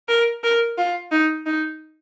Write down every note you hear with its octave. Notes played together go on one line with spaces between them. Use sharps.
A#4
A#4
F4
D#4
D#4